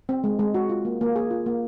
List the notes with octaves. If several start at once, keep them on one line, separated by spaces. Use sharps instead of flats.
C4
G#3
G#3
F#4
F4
A#3
A#3
G#4
F4
A#3